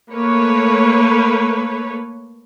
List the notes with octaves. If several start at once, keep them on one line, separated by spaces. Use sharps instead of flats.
A3 A#3 B4 C#5